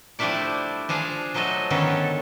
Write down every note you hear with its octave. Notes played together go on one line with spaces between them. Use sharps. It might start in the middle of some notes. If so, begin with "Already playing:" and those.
F3 G3 A3 D4 E4 D5
F3 D4 G#4 F5
F3 F#3 A3 A4 D#5
D3 D#3 B3 C#4 A4